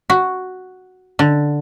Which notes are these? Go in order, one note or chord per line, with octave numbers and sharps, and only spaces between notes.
F#4
D3